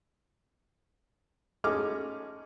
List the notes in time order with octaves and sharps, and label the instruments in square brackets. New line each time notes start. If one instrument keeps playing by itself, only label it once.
[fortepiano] G#3 A3 C#4 D#4 D6 F6